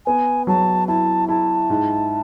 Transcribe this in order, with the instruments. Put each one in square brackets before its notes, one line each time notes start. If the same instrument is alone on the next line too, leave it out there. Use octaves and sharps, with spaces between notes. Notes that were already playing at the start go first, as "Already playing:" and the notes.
[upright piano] B3 [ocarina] G#5
[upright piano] F#3 [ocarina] A5
[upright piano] E4 [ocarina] A5
[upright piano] E4 [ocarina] A5
[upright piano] G#2